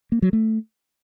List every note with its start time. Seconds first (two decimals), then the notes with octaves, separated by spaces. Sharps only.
0.12 A#3
0.22 F#3
0.33 A3